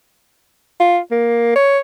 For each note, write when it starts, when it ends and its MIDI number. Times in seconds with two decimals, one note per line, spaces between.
0.80 0.99 65
1.11 1.53 58
1.56 1.79 73